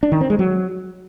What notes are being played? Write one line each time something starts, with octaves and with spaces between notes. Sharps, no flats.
D4
D#3
C4
G#3
F#3